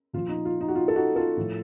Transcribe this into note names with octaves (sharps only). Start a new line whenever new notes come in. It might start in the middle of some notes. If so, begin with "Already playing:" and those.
A#2 F3 F4
D#4
F4
D#4
F#4
F4
A4
D#4 F#4
F4 A4
A2 F3